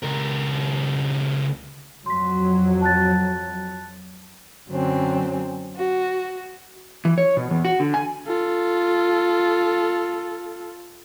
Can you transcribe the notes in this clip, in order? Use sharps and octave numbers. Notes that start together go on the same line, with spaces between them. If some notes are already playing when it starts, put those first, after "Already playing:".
C#2 A#4
F2 F#3 C6 B6
A5 F#6 A6
F#2 D3 F#3 C4 C#4
F#4
E3
C#5
B2
E2
F#4
D3
G#5
F4 A4